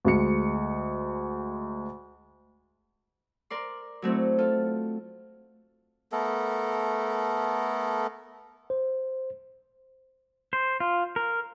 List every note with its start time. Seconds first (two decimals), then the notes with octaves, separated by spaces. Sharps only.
0.05 D2 G#3 C#7
3.50 A#4 D5 C6
4.02 F#3 A3 C4 E4
4.38 F4 A4
6.12 A3 B3 A4 A#4
8.70 C5
10.53 C5
10.80 F4
11.16 A#4